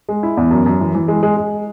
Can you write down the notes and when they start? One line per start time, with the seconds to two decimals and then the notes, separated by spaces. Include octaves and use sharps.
0.09 G#3
0.23 E4
0.37 E2
0.51 F#2
0.66 F#2
0.80 E3
0.95 E3
1.08 G#3
1.23 G#3
1.37 G#3